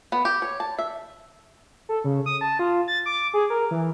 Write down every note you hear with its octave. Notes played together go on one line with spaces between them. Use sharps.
B3
G4
C#5
A5
E5
A4
C#3
D#6
A5
F4
A6
D6
G#4
A#4
E3